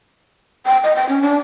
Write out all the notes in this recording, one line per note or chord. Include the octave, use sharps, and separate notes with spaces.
G5
D#5
G5
C#4
D4